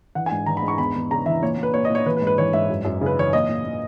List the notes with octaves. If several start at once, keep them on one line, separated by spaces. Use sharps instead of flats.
E3 F#5
G#5
G#2
E3 A#5
B5
G#2
C#6
E2 B5
E2
C#3 A#5
E3 E5
A#2 C#5
A#2 B4
A#2 C#5
D#5
A#2 C#5
E3 B4
B4
G#2
B4
E3 C#5
G#2 E5
F#2
F#2
C#3 B4
E3 C#5
A#2 D#5
A#2
A#2